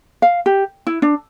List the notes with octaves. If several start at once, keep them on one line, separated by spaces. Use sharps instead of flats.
F5
G4
E4
D4